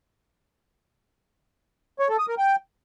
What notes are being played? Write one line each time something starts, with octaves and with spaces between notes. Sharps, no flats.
C#5
A4
D#6
A#4
G5